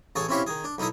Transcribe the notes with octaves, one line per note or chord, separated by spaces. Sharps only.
A1 G#4 A4 C#5 G#5
C4 C#4 E4 G4 C#5 F5
D#3 G#4
D4
B1 D#4 E4 A4 D#6